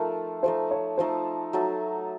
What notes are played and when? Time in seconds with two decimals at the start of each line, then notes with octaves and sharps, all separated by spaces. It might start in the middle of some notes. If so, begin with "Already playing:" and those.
Already playing: F3 A3 D#4 A#4
0.43 F3 A3 D#4 C5
0.71 C#5
0.98 F3 A3 D#4 C5
1.53 F#3 A3 D#4 A4